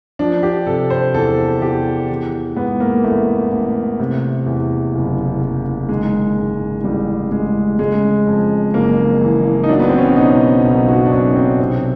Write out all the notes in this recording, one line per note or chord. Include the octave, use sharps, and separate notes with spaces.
F3 D4
G4
C3 A4
C5
E2 A4
E2 G4
E3
G#2 B3
A#3
A1 A3
A1
C3
E2
F#1
F#1
D#3 G#3
G#2
A1 G3
A1 G#3
C#3 G#3
F2
F#1 A#3
E3
D#4
F#3 D4
B3
C4
C#4
D4
B2 D#4
B1
F#4
D4
B1 C#4
C4
C3 C4